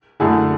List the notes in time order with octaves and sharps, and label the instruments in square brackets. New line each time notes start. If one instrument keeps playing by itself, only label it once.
[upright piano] F#2 D3 A3 E4 G#4